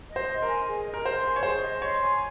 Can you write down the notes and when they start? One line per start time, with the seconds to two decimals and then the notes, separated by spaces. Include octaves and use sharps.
0.11 D#5
0.16 C5
0.30 C6
0.42 A#4
0.48 G#5
0.67 G#4
0.86 D#5
0.94 A#4
1.05 C5 C6
1.24 G#5
1.36 C#5
1.43 G#4 C5
1.62 D#5
1.81 C#5 C6
2.00 G#5